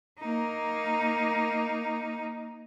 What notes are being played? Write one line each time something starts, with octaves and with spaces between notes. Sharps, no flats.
A#3 D#4